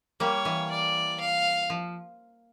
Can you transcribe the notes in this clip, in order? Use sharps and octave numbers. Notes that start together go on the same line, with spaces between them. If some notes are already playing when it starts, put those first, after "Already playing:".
G3 A#3 C#5
E3
D5
F5
F3